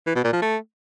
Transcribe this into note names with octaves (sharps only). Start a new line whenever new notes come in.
E3
B2
A#2
F3
A3